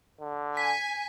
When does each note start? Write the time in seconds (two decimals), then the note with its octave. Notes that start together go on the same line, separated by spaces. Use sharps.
0.20 D3
0.57 G#5 B6